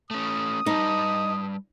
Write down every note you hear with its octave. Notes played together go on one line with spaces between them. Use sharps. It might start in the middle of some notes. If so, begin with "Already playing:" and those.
A3 C#4 D#6
G3 D#4 B4 A5